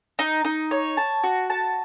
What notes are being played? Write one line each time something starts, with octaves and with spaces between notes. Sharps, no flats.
D#4
D#4
C#5
A5
F#4
A5